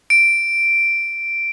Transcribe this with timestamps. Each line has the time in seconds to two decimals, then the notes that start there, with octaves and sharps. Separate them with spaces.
0.10 D7